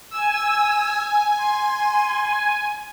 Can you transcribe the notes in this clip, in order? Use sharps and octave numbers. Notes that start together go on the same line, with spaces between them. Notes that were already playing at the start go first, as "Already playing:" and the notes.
G#5 E6
C6